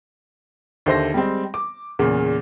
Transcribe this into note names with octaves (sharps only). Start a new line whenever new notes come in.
D#2 D3 C5 E5 C6 A#6
G3 G#3 C4
D6
E2 A#2 C#3